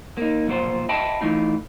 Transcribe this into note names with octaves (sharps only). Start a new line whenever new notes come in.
A#3 D#4
B1 F2 A#2 F4 C5
D#5 E5 G5 A5 B5
E3 A3 D#4 F4